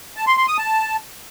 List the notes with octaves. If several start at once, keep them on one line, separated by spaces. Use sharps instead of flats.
A5
C6
C6
D#6
A5